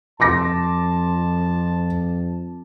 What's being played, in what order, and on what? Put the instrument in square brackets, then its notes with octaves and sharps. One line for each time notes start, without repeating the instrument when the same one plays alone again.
[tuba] F2 [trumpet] A5 [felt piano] C6 D6 A#6